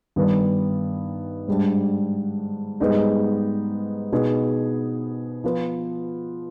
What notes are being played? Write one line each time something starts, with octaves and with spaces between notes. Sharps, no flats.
G2 D#3 G3 B3
G#2 G3 D4
G#2 G3 B3 D#4 G#4
B2 B3 D#4 G#4
F3 B3 F4 B4